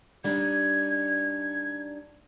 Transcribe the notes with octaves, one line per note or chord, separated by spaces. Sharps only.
G3 D4 D#4 G#6